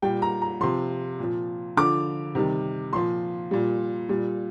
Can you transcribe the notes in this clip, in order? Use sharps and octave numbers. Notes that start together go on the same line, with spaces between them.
A#2 G3 G5
A#5
A#5
C3 F3 C6
A#2 F3
D3 F3 D6
C3 D#3 G3
A#2 F3 C6
A#2 G3
A#2 G3